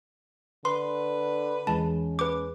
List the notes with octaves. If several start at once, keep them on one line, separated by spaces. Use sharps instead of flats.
D3 B4 C6
E2 E3 G#3 C#4 A5
B4 D6